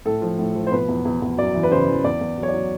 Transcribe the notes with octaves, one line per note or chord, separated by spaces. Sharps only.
A2 A4
F3
A2
F3
C5
B2 B4
E2
E2
E2
F#2 D5
E3
B4
C#3 C5
E3
E2 D5
E2
F#3
C#5
D5
F#3